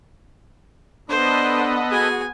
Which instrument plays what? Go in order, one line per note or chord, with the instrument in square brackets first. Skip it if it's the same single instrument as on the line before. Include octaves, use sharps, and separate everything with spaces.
[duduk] B3 [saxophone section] D4 [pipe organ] A4 B4 D#5 [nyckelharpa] C5
[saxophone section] F#4 G#4 [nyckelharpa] G#5